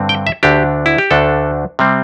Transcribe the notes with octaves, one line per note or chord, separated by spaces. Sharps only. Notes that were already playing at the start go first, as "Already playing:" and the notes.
Already playing: G2 D3 C4
G5
E5
D2 D3 A3 D4 G4
E4
G4
D2 D3 A3 D4 A4
C3 G3 C4